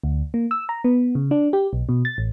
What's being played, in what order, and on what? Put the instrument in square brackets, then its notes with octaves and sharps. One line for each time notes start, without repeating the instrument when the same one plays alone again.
[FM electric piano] D2
A#3
E6
A#5
B3
C#3
D4
G4
B1
B2
A6
A1